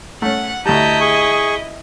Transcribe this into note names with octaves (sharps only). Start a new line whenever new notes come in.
A3 C#4 F#5
D2 G3 E4 D#5 A5 A#5 G6
G#4 C#6